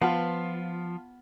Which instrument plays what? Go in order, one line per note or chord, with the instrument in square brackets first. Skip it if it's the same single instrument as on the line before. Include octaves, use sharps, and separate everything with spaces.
[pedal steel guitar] F3 [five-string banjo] B3 [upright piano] F4 A5